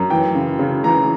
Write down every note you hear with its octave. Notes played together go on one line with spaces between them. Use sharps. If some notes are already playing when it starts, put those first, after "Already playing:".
Already playing: F#2
E3 G5
C#3
C#3
E3 A#5